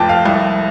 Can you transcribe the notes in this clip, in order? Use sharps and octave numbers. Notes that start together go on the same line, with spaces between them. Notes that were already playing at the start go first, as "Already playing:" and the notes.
Already playing: F1 F2 G5 A5 D6
F5
C2